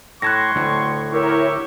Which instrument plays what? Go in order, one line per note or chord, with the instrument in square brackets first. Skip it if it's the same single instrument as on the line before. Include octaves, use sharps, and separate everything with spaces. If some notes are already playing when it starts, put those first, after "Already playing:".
[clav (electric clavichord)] A2 A5 [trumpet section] C6 C#6 [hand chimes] F#6 G#6 A#6
[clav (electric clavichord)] D2 A2
[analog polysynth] E4 A#4 C#5 [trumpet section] G4 E5 C#6